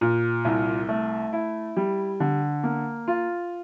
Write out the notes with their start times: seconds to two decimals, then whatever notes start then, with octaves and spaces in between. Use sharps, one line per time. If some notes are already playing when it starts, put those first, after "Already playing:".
0.01 A#2
0.45 C2
0.89 A3
1.33 E4
1.77 G3
2.20 D3
2.63 A#3
3.08 F4